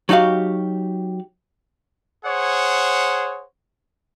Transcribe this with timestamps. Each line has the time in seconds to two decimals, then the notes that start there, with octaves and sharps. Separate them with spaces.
0.09 F#3 D#4 F#4 G4 F5
2.25 G#4 C5 C#5 F#5